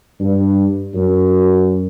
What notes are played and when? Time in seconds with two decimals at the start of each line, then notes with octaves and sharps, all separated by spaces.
0.20 G2
0.94 F#2